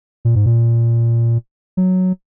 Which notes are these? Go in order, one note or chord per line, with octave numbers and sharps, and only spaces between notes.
A#2
G#2
A#2
F#3